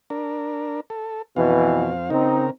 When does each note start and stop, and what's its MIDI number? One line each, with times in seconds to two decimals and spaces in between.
0.10 0.80 62
0.10 0.80 70
0.90 1.22 69
1.36 2.10 41
1.36 1.88 47
1.36 1.88 52
1.36 2.10 60
1.36 2.10 77
2.10 2.50 49
2.10 2.46 60
2.10 2.46 63
2.10 2.50 70